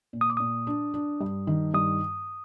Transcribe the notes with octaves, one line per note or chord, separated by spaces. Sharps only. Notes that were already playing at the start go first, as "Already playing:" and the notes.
A#2
D#6
D6
A#2 D#6
D4
D4
G2
D#3
G2 D#6